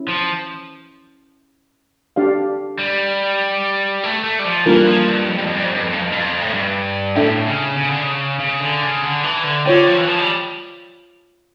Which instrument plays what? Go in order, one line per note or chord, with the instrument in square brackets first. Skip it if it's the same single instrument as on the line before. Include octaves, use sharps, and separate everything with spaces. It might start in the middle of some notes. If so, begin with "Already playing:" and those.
Already playing: [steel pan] C#4 E4
[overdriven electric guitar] F3
[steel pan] D4 G4 D5 F5
[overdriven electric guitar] G3
A3
A3
G3
F3
[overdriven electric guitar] E3 [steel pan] G3 A#3 D4 F4 A#4
[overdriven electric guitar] F3
G2
F2
G2
F2
G2
F2
G2
F2
G2
F2
G2
F2
A2
G2
[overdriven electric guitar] A2 [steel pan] D4 A4 E5 G5
[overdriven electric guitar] C#3
C#3
D3
C#3
C#3
D3
C#3
D3
E3
D3
[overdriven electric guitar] D3 [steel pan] F4 C#5 G5
[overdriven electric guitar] F3
E3
F3
G3